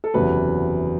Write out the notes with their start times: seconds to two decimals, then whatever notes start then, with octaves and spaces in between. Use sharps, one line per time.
0.04 A4
0.14 F#1 E2 C3 F#3 B4